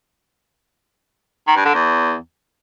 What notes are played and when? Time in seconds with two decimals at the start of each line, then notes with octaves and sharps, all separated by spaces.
1.48 D#3
1.57 G2
1.65 D3
1.74 E2